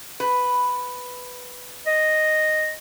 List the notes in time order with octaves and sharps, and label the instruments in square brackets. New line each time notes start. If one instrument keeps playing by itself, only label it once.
[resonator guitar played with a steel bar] B4
[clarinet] D#5